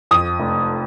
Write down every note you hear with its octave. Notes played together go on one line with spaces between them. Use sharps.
F2 D#6
F1